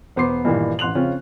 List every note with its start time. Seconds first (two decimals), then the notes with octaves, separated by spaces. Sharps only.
0.16 E1 B3 C5 C6 D6 C7
0.45 G2 A#2 D#3 E3
0.79 A1 C6 F#6 F7 F#7
0.95 F2 C#3 C4 C#4 F4